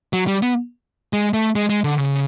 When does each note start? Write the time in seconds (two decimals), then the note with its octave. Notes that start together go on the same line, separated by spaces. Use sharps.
0.13 F#3
0.27 G3
0.42 B3
1.13 G#3
1.34 A3
1.56 G#3
1.69 G#3
1.84 D3
1.97 C#3